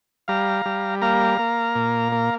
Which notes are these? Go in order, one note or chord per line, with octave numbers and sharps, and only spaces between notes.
G3 F5 A#5
G3
A#3 F5 A#5
A#3
A#2
A#3